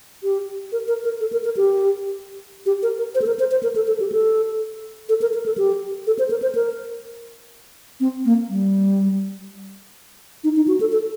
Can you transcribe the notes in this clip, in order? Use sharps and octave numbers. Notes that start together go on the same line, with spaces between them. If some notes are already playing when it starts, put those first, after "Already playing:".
G4
A#4
A#4
A#4
A4
A#4
A#4
G4
G4
A#4
A#4
C5
A4
A#4
C5
C5
A#4
A4
A4
G4
A4
A4
A#4
A#4
A4
G4
A4
C5
A#4
C5
A#4
C4
A#3
G3
D#4
D#4
F#4
A4
A4